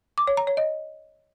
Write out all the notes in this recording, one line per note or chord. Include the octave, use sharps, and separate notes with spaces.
D6
C#5
A#5
C#5
D#5